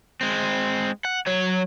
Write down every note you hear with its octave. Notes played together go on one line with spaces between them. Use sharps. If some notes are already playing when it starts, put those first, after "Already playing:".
G#3 C4
F#5
F#3 C#5